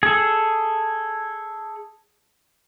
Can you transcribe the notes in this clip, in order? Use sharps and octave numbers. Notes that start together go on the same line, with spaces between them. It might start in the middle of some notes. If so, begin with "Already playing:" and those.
G#4 A4